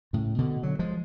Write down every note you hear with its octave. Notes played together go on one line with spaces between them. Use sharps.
A2 C#3
B2 D3
D3 F#3
F3 G#3